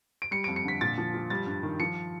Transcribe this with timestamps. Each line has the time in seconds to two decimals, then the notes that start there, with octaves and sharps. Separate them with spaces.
0.22 D7
0.31 G3 C#7
0.44 D7
0.48 F2
0.56 C#7
0.65 D3 B6
0.81 A#2 A6
0.98 F3
1.14 F3
1.30 G3 A6
1.47 G2
1.63 D#3
1.80 F3 C#7